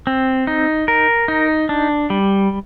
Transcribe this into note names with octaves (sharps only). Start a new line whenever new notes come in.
C4
D#4
A#4
D#4
D4
G3